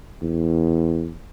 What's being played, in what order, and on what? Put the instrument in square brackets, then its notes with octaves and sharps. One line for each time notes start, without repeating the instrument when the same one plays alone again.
[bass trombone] E2